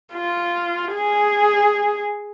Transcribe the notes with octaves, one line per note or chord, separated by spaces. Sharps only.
F4
G#4